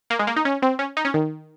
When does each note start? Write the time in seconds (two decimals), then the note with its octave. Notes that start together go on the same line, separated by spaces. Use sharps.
0.10 A#3
0.19 G#3
0.27 A#3
0.36 D#4
0.45 C#4
0.62 C4
0.79 C#4
0.97 D#4
1.05 C#4
1.14 D#3